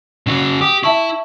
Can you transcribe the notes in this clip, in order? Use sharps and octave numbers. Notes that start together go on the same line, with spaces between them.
C#3 F#4
G4 D6 D#6
E4 E5 A5 C#6